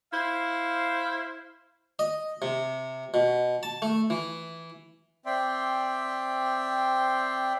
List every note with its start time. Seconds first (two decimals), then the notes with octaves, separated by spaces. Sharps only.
0.12 E4 C5 F5
1.99 D#5
2.42 C3
3.14 B2
3.63 A5
3.82 A3
4.10 E3
5.26 C4 D5 E5 G5 C6